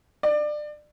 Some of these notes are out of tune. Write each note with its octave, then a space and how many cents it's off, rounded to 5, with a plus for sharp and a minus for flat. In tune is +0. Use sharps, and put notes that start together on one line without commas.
D5 +25